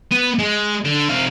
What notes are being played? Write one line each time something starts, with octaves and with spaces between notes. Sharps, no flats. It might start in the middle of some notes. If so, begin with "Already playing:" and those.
B3
G#3
D3
C3 F5